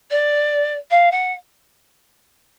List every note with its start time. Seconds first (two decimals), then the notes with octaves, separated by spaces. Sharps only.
0.11 D5
0.91 F5
1.11 F#5